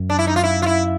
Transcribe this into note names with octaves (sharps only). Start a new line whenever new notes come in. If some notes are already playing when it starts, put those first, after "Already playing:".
Already playing: F#2
D4
E4
D#4
F4
E4
F4
E4